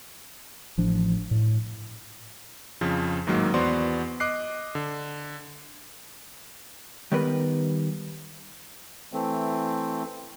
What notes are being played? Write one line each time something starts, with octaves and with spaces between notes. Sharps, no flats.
A1 F3 D4
A2
F2 C#3 F3
A1 G#2 D#3 F#3 A#3
E2 B3 F#4 C5 D5 C6
D#5 D6 F#6 C7
D3
D#3 G3 B3 A#4 B4
E3 A3 C4